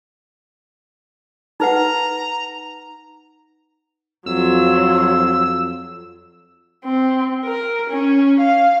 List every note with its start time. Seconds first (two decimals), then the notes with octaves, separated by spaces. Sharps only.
1.60 D#4 B4 F#5 A#5
4.26 F2 F#3 F4 E6
6.85 C4
7.44 A#4
7.90 C#4
8.40 F5